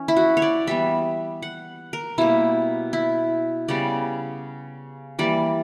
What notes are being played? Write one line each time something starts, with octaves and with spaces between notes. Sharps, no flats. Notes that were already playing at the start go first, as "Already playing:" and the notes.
Already playing: E3 C#4
E4
F#4
C#5
D5
E3 G3 B3 E5
F#5
A#4
B2 G3 A#3 E4
E4
C#3 G3 B3 D5
E3 G3 A#3 D5